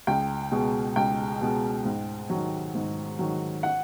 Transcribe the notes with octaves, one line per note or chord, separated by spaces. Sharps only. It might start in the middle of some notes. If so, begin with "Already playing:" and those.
C#2 G5
B2 G#3
C#2 G5
B2 G#3
G#2
D#3 F#3
G#2
D#3 F#3
F#5